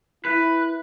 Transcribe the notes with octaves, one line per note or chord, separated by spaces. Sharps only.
E4 B4